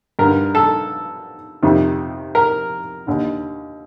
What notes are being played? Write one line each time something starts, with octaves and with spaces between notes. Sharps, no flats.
G2 D3 A#4
A4
F2 C3 D#3
A#4
D#2 D3